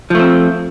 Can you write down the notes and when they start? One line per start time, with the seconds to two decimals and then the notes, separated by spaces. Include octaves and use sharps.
0.10 F3
0.15 A3
0.19 C4